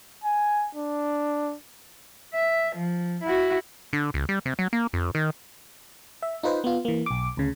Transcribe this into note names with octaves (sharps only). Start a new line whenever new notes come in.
G#5
D4
E5
F3
E4 F#4
D3
C#2
G3
C3
F#3
A#3
F2
D#3
E5
D#4 F4 B4 C5
B3 F4
E3 A#3
B1 D6
D2 C#3